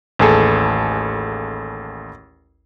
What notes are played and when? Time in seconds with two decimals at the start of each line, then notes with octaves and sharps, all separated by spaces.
0.19 A1 D#2 G#4 A4